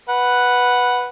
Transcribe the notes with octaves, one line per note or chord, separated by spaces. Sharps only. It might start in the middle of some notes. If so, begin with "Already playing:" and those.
B4 F#5